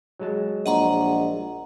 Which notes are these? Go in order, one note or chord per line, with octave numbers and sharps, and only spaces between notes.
F#3 G#3 A5
A#1 D#5 F#5 A#5